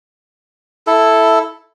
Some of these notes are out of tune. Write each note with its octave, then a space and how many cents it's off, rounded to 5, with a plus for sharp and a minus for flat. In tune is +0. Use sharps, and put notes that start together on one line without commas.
E4 +0 A4 +0